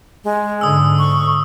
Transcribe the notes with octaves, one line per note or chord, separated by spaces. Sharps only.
G#3
G#2 D3 D#6 E6
C#6